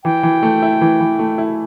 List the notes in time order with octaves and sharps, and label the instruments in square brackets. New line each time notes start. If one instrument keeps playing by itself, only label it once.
[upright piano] E3 [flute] G5
[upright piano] E3
A3
E4
E3
E3
A3
E4